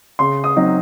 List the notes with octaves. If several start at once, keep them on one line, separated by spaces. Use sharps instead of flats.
C#3 C6
D#6
F#3 C4 D#4